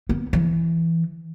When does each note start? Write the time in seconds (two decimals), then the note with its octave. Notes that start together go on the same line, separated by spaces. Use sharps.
0.09 B3
0.33 E3